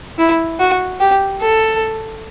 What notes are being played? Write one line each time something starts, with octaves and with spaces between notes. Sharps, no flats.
E4
F#4
G4
A4